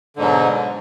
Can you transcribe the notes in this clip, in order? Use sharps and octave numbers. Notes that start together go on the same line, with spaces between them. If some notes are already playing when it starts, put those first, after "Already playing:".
G#2 B2 D3 F#3